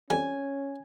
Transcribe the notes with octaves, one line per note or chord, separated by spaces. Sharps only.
F2 G3 C#4 G#5